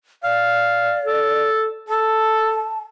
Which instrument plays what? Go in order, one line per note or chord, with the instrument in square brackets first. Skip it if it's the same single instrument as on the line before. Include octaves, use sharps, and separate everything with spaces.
[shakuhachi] D5 [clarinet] F5
[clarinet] A4
[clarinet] A4 [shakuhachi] A5